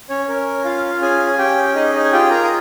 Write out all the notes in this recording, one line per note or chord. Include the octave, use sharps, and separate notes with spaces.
C#4 C#5
C#4 A#4
F4 F5
C#4 G#4 G#5
G#5
C#4 G4 G5
D#4 G#4 D#5
D#4 D#5
G#5
F4 G4 G5
A#4 A#5
D#6